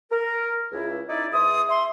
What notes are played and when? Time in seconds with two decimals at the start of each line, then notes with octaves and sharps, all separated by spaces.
0.11 A#4
0.72 C#2 E4
1.09 D#4 E4 D5
1.32 E2 E5 C6 D#6
1.69 E5 C6